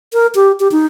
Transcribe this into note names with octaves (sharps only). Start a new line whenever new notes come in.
A#4
G4
G4
D#4